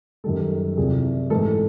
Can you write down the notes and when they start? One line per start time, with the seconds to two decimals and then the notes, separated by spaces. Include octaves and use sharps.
0.24 F#2 D#3 G3 A4
0.77 C2 C3 F3 G#4
1.30 G#2 E3 A3 A4